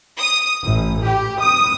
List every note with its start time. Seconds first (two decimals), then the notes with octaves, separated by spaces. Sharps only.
0.19 D#6
0.63 A1
1.03 G4
1.40 D#6